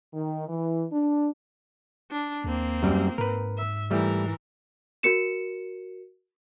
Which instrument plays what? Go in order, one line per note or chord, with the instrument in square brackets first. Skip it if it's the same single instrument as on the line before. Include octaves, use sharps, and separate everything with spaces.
[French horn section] D#3
E3
D4
[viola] D4
[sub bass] D#2 [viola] A#3 C4
[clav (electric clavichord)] F#2 G3
[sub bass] G#2 [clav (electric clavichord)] A#4 B4
[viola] E5
[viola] E3 A#4 [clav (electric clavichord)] G3 A3
[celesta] F#4 A#4 C#7 E7